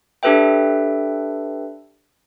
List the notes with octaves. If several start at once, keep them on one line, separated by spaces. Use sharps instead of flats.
D4 G4 A4 B4 E5 G5